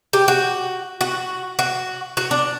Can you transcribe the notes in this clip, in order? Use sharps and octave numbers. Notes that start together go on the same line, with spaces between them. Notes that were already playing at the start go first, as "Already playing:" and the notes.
G4
F#4
F#4
F#4
F#4
D4